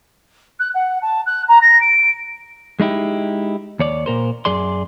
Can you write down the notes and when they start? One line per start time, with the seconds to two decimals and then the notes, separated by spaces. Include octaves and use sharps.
0.59 F#6
0.74 F#5
1.02 A5
1.26 F#6
1.48 A#5
1.61 A#6
1.81 D7
2.80 G#3 D#4 E4 G4
3.79 D#2 C#5 D5
4.06 A#2 A#4 C5
4.45 F#2 G#4 D5 C6